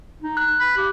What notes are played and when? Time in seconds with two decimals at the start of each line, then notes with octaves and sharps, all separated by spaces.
0.22 D#4
0.37 F#6
0.60 B5
0.77 G4